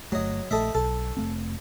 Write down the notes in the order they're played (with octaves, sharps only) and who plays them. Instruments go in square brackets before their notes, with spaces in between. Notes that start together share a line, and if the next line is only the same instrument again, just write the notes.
[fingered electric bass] G1 A3 [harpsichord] F#3 D#5
[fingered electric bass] A#1 A3 [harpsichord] A4 D#5 E5
[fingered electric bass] B1 [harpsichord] A4
[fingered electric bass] F1 A3 C4